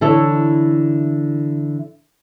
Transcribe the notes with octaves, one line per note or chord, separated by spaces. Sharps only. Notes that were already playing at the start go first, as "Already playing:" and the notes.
D3 E3 E4 A4 C#5 E5